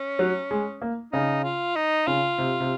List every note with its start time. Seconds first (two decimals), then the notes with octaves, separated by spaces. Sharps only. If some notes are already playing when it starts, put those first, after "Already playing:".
Already playing: C#4
0.19 F#3
0.51 G#3
0.82 A#3
1.13 C#3 D#4
1.44 F4
1.76 D#4
2.07 C#3 F4
2.38 C3
2.60 C3